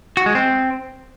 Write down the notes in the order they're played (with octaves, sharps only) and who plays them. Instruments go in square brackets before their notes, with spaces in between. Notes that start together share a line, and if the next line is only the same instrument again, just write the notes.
[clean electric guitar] F#4
G#3
C4